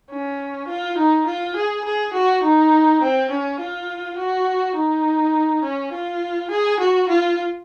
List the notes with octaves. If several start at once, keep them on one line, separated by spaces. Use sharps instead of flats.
C#4
F4
D#4
F4
G#4
G#4
F#4
D#4
C4
C#4
F4
F#4
D#4
C#4
F4
G#4
F#4
F4